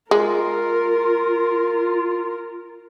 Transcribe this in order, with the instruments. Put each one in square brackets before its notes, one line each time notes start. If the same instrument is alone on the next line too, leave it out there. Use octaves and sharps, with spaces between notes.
[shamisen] G#3 [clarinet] F4 [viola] A#4